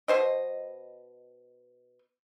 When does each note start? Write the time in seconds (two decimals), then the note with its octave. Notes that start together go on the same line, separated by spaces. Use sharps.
0.08 B2 C5 D#5